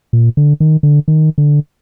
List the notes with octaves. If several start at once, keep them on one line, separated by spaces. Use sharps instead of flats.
A#2
D3
D#3
D3
D#3
D3